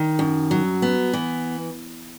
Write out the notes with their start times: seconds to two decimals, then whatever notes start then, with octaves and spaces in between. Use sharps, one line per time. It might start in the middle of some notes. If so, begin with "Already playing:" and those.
Already playing: D#3
0.19 F#2
0.51 F#3
0.82 B3
1.13 E3